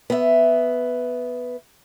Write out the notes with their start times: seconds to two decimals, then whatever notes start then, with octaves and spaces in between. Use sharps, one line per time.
0.10 B3 E5